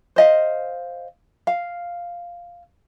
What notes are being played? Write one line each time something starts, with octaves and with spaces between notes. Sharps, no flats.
C5 D#5 F5
F5